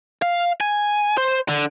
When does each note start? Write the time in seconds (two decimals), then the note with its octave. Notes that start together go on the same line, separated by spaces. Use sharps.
0.22 F5
0.61 G#5
1.17 C5
1.49 D3